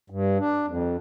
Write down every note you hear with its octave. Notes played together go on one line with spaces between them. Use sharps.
G2
D4
F2